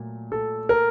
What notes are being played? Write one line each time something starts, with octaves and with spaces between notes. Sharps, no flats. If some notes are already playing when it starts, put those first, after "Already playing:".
Already playing: A#2 F#3 A3
A4
A#4